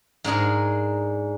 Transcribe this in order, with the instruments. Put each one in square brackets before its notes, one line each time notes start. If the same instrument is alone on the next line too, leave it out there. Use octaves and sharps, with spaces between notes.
[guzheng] G#2 D4 G#4 A#4